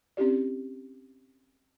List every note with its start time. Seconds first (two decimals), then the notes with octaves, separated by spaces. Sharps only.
0.17 C4 C#4 E4 G4 D5